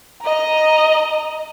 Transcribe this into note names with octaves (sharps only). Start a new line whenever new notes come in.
D#5 A#5